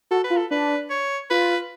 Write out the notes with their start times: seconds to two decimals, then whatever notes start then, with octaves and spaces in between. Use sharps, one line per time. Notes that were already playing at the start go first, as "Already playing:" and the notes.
0.11 F#4 A4
0.24 B4
0.30 F4
0.37 A4
0.51 D4 B4
0.90 C#5
1.30 F4 B4